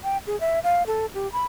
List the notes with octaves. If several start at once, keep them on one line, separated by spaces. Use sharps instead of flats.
G5
G#4
E5
F5
A4
G4
B5